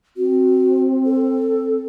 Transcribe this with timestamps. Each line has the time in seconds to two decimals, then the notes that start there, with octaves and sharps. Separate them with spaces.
0.17 C4 F#4
1.05 A4